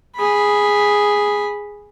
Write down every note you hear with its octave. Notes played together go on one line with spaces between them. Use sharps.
G#4 B5